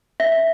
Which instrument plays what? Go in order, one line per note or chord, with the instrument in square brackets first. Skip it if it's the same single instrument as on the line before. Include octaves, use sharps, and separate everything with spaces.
[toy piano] E5